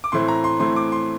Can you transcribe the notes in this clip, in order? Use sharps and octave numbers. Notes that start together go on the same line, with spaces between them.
D6
A2 E3 A3 C4 C6
A#5
C6
A2 E3 A3 C4 C6
D6
C6